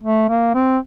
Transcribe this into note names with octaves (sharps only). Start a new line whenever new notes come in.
A3
A#3
C4